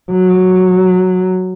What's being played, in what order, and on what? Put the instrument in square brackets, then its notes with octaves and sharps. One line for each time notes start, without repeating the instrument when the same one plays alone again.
[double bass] F#3